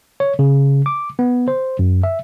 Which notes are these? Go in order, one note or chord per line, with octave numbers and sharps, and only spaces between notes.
C#5
C#3
D6
B3
C5
F#2
E5